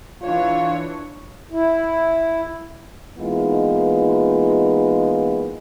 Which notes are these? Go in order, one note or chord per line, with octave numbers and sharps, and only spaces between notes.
E3 D4 F4 C#5
E4
E3 G#3 A#3 B3 D#4 F4